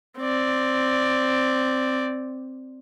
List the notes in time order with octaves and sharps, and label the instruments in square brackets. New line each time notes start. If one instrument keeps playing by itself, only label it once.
[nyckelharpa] C4 D5